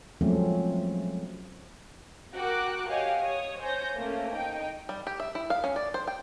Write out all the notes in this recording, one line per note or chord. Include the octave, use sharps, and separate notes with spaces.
F3 F#3 G#3 A3 C4 C#4
F#4 A#4 G5 D6 F#6
G4 C#5 D#5 F5 F#5 G#5
C#5 D#6
C5 C#5 G#5 G6 A#6
A3 A#3 C#4
D#4 G5
G3
G4
E5
E4
F5
C#4
D5
C5
G5